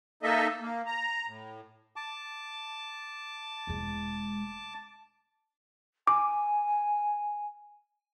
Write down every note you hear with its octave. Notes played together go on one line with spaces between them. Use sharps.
A#3 D#4 A4 D#5 E5
A#3
A#5
A2
A5 D6
E1 G#3
G#5 D6